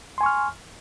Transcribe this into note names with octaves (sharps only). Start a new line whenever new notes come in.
G#5 C6 C#6 F6